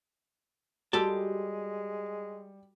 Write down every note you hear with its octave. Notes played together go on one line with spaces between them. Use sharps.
G3 G#3 F#4 G4 A4 A5 E6